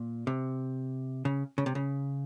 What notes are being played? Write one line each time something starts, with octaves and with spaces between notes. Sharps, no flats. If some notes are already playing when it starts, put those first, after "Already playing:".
Already playing: A#2
C3
C#3
C#3
C3
C#3